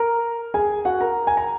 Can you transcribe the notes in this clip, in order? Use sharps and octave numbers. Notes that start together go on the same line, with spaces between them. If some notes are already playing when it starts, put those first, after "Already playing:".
Already playing: A#4 A#5
G#4 G#5
F#4 F#5
A#4 A#5
G#5
A#5